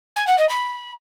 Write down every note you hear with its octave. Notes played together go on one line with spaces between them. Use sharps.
G#5
F#5
D#5
B5